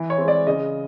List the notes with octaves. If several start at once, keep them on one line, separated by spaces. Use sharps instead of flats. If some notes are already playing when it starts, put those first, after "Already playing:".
Already playing: E3
C#5
C4
G#3 D5
C#3 D#5